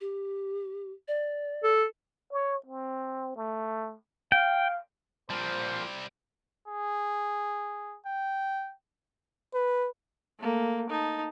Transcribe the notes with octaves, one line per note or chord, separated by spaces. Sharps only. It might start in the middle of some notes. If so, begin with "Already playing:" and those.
G4
D5
A4
C#5
C4
A3
F5 G5
F3 G3 A#3 C4 C5
G#4
G5
B4
A3 A#3
D#4 A5